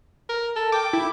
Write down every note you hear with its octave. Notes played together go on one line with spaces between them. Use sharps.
A#4
A4
G5 D6
E4